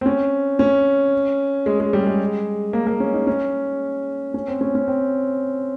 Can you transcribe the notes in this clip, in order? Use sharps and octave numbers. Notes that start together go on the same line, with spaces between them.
C4
C#4
C#4
G#3
G#3
G3
G#3
A#3
A#3
C#4
D#4
C#4
C#4
C4
C#4
C#4
C4